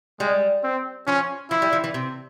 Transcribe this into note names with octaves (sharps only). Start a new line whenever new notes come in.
G3 G#3
C4
F3 C#4
F3 E4
G3
F3
E3
C3